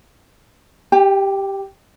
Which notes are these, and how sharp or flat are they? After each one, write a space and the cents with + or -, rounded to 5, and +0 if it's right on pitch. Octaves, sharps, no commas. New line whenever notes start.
G4 +0 G5 +40